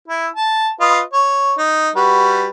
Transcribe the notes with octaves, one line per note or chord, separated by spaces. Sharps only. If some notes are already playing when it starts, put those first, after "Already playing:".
E4
A5
F4 B4 D#5
C#5
D#4
G3 F#4 B4